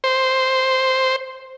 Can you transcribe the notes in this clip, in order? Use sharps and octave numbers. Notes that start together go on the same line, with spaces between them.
C5